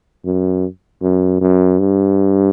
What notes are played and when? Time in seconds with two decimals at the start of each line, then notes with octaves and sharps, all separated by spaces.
0.25 F#2
1.02 F#2
1.41 F#2
1.79 G2